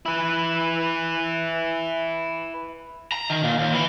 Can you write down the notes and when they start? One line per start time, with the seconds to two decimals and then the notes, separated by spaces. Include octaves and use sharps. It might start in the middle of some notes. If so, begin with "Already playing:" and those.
0.06 E4 B4
3.12 A#5
3.30 D#3
3.44 A#2
3.58 D#2
3.74 E3